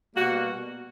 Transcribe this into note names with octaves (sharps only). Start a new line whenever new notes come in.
B2 G3 A#3 F#4